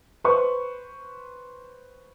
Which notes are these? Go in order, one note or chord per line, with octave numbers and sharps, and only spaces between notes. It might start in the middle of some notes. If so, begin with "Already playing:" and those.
B4 C5 C#6